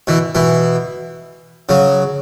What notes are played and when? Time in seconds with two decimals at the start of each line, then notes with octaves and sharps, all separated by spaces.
0.07 B2 E3
0.35 B2 E3
1.69 C#3 F#3